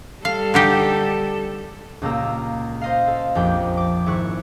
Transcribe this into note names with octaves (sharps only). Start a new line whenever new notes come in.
G3 A4 F5
D3 D#4 G4
C#2 A#2 A#3 G4 A#5 E6
C5 D#5 F5
A4
A#1 F2 G4 G5
D6
G#1 E4 C#6 F#6